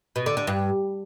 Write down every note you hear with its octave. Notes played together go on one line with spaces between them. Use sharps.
B2
D3
D3
G2